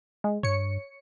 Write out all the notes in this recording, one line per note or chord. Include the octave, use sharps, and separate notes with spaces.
G#3
G2 C#5 C#7